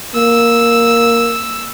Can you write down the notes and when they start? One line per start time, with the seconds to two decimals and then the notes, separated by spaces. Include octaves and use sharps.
0.15 A#3 E6